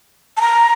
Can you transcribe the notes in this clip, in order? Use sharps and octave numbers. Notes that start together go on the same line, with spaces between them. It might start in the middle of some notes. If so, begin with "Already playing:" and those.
A5
A#5